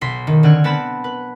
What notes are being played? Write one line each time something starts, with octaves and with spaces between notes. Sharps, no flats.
B1 C6 B6
D#3
D3 C4 F#5 G#5 F6
B3 C4 A5 B5 E7
B4